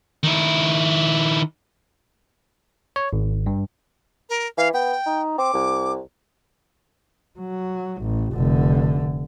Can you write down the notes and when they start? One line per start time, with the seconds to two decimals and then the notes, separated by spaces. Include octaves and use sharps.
0.23 D#3 E4
2.96 C#5
3.13 G#1
3.46 G2
4.30 A#4
4.57 E3 F5
4.74 B3 G5
5.06 D#4
5.38 C4 D6
5.54 C2
7.39 F#3
8.01 A1
8.34 F1 D3